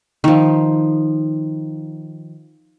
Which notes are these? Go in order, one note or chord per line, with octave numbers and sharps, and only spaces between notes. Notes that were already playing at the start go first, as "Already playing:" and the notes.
D#3 F3